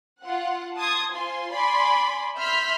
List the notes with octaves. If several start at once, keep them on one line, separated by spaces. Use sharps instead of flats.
F4 F#5
A5 C6 D#6 G#6
F4 C5 G#5 C6
D5 G#5 B5 C6
E5 B5 C6 F6 G6 B6